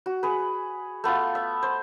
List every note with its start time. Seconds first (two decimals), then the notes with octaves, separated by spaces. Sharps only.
0.06 F#4
0.23 G#4 B4
1.04 A3 B3 F4 F5
1.35 E5
1.63 C5